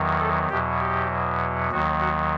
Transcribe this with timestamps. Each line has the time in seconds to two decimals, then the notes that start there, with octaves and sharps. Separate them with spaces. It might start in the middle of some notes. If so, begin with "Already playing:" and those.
Already playing: E2 D#3 F#3
0.20 A4
0.49 E2 B2 F#3 G4
0.80 G4
1.71 D#2 D#3 F#3 F#4
2.00 F#4